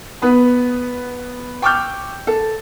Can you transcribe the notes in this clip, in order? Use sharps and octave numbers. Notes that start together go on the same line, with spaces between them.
B3 B4 D#6
G5 C#6 D6 E6 F6 G6
A4